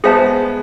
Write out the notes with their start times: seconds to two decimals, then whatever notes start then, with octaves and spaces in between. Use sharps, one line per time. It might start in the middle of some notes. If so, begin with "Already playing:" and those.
0.04 G#3 B3 G#4 C5 E5 A5